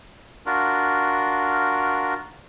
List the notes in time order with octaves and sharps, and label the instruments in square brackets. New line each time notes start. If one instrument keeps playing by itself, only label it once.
[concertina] D4 F4 F#4 A#4